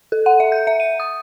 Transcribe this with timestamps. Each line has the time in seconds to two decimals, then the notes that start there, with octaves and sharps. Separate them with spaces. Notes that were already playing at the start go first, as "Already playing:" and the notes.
0.12 A4
0.26 F#5
0.40 E5
0.52 G6
0.67 E5
0.80 D#7
1.00 D#6